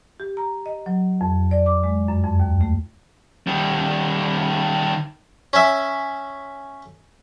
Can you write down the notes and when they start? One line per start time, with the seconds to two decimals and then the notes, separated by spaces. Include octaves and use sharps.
0.20 G4
0.37 A#5
0.66 D#5
0.86 F#3
1.21 F2
1.51 D5
1.66 D6
1.84 G#3
2.08 F#2
2.23 F2
2.40 D#2
2.61 A3
3.47 D#3 G3
5.53 C#4 E5